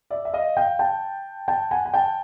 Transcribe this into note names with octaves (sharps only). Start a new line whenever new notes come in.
D5 E5
E5
D#5 F5
F5 G5
G5 A5
G5 A5
F#5 G#5
G#5
G5 A5